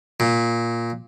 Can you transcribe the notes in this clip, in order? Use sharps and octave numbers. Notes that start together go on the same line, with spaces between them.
A#2